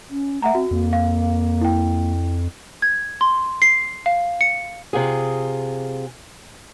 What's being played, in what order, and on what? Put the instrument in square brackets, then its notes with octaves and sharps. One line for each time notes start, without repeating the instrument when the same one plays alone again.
[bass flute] C#4
[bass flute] A3 [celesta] E5 F#5 A#5
[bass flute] C4 [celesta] F#4
[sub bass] F2 [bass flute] A#3
[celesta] F5
E4 G5
[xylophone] G#6
C6
C7
F5
C#7
[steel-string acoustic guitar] C3 F4 G#4